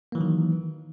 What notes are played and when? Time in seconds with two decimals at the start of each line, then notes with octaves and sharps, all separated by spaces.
0.12 A#3
0.15 E3
0.18 F#3
0.21 D#3